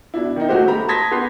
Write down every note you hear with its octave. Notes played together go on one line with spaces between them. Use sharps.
B2 D4 E4
D#3 D#4
D2 A3 F#4 G4 C5
A3 G4 A#5 B5
A5 C6 D#6 G#6 A#6 B6
B3 G4 B4 C6 C7